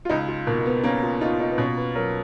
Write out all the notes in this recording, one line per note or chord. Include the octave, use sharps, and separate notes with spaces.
F4
C#2 D#4
F4
B2 A#3
A#3
B3
A#3 C#4
F4
D#4 F4
D#4
B3
B2 C#4
B4
F#3 A#4